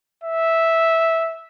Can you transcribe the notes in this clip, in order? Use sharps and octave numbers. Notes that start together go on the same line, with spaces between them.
E5